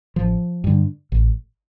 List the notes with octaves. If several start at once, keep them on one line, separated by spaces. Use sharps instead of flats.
A1 F3
G2 D3
A1